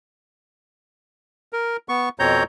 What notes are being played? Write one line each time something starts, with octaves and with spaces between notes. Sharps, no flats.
A#4
B3 C#6
F2 B2 C4 C#5 A#5 G6